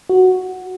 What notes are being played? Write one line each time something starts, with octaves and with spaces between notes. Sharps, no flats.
F#4